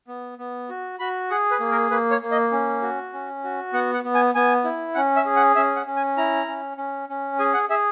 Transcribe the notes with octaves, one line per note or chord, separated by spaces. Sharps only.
B3
B3
F#4
F#4 B5
G#4 F#5
B4
A#3
A#4
A#3 B4
C#5
A#3
D#5
C#4
F#4
C#4
F#4
B3 F#5
F#5
B3
G#5
B3 G#5
E4
C#4 F#5
E5
G#4
F#5
C#4 E5
F#5
C#4
G#5
E4 A#5
C#4
C#4
C#4
G#4 G#5
F#5
G#4 E5